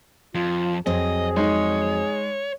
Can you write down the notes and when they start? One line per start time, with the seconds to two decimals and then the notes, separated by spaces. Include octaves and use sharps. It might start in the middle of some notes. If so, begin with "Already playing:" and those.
0.35 F2 F4
0.86 F2 F#3 C4 G#4 D#5
1.37 G#3 D#4 C#5